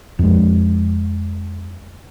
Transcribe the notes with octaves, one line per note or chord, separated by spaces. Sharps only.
F2 G#3